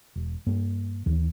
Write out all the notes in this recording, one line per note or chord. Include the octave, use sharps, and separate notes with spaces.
E1
G2 A#3
D#2 E3